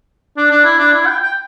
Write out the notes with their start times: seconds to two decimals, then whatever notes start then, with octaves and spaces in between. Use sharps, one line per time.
0.37 D4
0.51 D4
0.64 E4
0.79 D4
0.93 E4
1.07 G5
1.22 G5